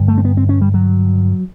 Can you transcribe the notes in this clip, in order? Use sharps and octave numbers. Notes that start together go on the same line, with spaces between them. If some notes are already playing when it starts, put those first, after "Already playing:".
Already playing: G2 D3
A3
C4
B3
C4
C#4
G3
F#3